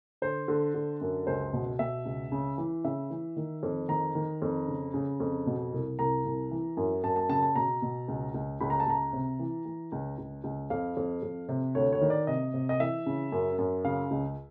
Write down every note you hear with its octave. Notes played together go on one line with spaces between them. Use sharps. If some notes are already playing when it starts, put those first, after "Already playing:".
D3 C5
D3
D3
F#2
C#2 C5
B2
B2 E5
C#2
C#3
E3
C#3 E5
E3
D#3
F2
D#3 A#5
D#3
F2
C#3
C#3
F2
B2
C2
C2 A#5
C2
E3
F#2
F#2 A5
A5
C#3 A5
A5
B2 A#5
B2
C#2
C#2
C#2 B5
A#5
A5
C#2 A#5
C3
E3
E3
C#2
C#2
C#2
F2 F5
F2
F2
C3
D2 C#5
C#5
D#3
D5
C3 D#5
C3
D#5
E3 E5
C#3
F#2
F#2
C#3 F5
C#2